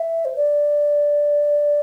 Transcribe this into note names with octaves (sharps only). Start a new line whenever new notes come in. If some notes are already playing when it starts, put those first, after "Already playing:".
Already playing: E5
C5
D5